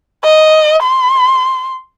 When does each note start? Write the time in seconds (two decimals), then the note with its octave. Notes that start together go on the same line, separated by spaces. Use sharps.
0.24 D#5
0.82 C6